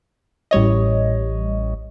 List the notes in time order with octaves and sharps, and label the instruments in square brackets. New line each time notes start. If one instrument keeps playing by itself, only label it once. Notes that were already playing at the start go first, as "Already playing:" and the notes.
[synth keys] A1 G3 C#5 D#5